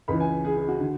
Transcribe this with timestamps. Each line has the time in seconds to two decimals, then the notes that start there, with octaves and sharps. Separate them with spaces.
0.08 C#2 C#3 E3 B5
0.20 G#5
0.45 G#4
0.57 G#4
0.68 F#4
0.81 D3